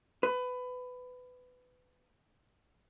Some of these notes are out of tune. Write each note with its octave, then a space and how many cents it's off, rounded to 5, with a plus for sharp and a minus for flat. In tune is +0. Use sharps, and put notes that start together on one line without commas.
B4 +20